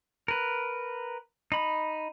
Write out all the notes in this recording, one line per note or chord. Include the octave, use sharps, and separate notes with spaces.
A#4 B4
D#4 B5